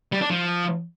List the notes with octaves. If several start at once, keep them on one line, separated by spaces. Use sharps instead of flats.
G3
D4
F3